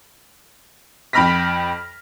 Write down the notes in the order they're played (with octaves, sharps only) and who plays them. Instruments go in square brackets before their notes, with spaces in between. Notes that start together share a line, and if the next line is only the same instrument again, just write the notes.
[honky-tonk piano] F2 G5 B5 F6 A#6 B6